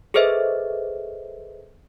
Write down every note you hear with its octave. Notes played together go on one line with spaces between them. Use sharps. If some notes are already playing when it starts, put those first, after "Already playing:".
G#4 A4 B4 C5 D#5 E5